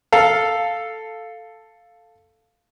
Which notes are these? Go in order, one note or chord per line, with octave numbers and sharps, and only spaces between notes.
A4 F5